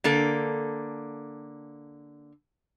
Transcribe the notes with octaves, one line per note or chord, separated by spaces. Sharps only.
D3 A#3 A4